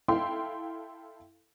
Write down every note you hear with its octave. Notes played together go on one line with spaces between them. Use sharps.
E4 A4 F5 G5 C6